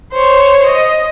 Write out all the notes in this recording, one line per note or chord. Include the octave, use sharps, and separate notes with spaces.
C5 C#5
D#5